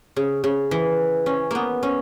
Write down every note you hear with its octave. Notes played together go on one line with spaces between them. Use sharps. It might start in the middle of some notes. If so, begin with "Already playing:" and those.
C#3
C#3
E3
C#4
A#3 B3
C#4